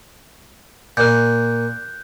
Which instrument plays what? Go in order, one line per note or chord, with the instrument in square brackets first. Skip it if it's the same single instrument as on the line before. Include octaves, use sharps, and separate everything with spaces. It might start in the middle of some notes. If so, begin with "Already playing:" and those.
[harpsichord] A#2 [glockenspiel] F#6 G6